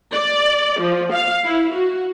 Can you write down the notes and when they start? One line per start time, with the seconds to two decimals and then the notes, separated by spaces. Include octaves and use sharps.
0.14 D5
0.80 F3
1.13 F5
1.46 E4
1.75 F#4